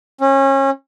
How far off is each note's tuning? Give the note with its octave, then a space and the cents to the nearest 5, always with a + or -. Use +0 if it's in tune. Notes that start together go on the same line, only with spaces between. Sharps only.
C#4 -30